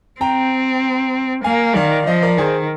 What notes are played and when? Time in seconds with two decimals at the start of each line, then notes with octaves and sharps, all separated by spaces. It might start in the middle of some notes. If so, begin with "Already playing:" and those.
0.21 C4 G5 A#5
1.44 A#3 F5 G#5
1.75 D#3 D5 F5
2.06 F3 C5 D#5
2.22 A#4 D5
2.38 D#3 G#4 C5